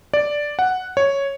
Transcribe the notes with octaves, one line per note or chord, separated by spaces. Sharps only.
D5
F#5
C#5